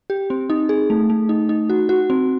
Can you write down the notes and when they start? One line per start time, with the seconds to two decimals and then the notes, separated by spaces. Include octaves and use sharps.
0.10 G4
0.30 C4
0.50 D#4
0.69 G#4
0.90 A3
1.10 A3
1.29 D#4
1.49 D#4
1.69 F#4
1.89 F#4
2.10 C4